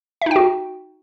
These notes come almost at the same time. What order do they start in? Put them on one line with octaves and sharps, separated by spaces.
E5 D#4 G5 F#4